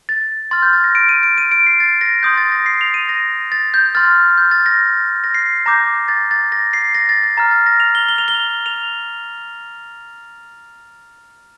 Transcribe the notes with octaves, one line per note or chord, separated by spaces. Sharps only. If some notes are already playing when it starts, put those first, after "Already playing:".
A6
C6 F6 A6
G6
A6
A#6
D7
D#7
D7
D#7
D7
C7
A6
A#6
C6 D#6 G6
A6
A#6
C7
F7
D#7
A#6
A6
G6
C6 F6 A6
G6
A6
A#6
A#6
C7
A#5 D6 G6 A#6
A6
A6
A#6
C7
A#6
A6
A6
A#5 F6 A6
A6
A#6
F7
G7
G7
F7
G7
F7